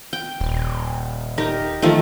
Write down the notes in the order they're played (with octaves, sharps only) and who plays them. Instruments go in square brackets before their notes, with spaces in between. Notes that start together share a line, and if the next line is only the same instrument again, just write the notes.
[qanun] G5
[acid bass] D#1
[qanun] D#4 G4 A#4
D#3 F3 A3